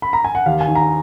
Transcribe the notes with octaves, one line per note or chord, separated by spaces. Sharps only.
B5
A#5
G#5
F#5
D#2 F5
G#5
D#3
A#5